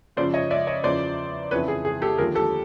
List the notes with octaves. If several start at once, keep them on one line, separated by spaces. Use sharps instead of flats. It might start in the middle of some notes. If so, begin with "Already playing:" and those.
F#2 C#3 F3 C5 D5
C#5 D#5
D5 E5
C#5 D#5
E2 C#3 F3 C5 D5
F2 C#3 E3 B4 C#5
G#4
G#4
G4 A4
D#2 D3 F3 G#4 A#4
G4 A4